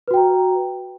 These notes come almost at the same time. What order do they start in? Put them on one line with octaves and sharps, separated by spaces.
B4 F#4 G5 A#5